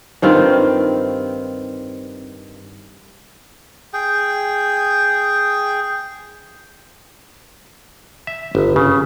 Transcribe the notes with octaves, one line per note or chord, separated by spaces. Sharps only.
G2 D#3 C4 F4
G#4 G5
E5
G1
C#3